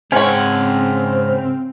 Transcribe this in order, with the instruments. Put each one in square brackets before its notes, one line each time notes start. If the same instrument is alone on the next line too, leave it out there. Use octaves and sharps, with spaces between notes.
[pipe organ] G#2 G#3 F6 [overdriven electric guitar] C#3 F#5 [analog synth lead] C4 [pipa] C#4 C#5